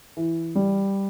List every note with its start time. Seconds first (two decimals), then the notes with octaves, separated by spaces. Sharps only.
0.17 E3
0.55 G3